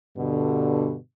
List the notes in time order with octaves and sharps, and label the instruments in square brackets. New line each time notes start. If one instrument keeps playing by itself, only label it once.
[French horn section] G2 B2 D3